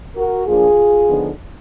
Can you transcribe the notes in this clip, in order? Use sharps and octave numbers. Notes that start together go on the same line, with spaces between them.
F#4 A#4
F3 A#3 D4 F4 G#4
D3 F3 B3 D#4